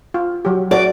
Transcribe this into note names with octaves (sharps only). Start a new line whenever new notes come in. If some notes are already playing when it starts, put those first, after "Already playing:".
F4
F#3 G4
F#4 D5